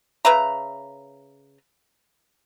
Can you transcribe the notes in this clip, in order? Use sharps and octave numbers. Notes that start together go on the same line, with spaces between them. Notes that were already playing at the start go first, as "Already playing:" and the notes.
C#3 B4 E5 A#5